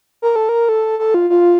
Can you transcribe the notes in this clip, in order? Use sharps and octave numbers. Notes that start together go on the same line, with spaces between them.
A#4
A4
A#4
A4
A4
F4
F4